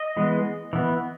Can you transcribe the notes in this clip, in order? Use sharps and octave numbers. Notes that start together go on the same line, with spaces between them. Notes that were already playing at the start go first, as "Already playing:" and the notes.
Already playing: D#5
E3 G#3 B3
E3 B3